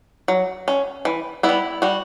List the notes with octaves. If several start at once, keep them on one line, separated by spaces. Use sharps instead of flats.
F#3
C#4
E3
B3 E4
G3
G3 F#4